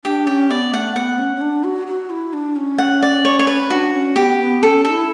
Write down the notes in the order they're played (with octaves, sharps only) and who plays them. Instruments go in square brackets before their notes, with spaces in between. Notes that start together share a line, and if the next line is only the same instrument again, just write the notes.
[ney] D4 [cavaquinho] G4
[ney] C#4 [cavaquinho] G4
[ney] B3 [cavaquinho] D5
[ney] A3 [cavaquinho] F#5
[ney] B3 [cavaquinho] F#5
[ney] C#4
C#4
D4
F#4
F#4
E4
D4
C#4
[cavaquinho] F#5
D5
C#5
C#5
B4
[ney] C#4
[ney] D4 [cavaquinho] F#4
[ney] C#4
[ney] B3 [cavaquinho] G4
[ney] B3
[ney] C#4 [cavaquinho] A4
[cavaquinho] A4
[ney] E4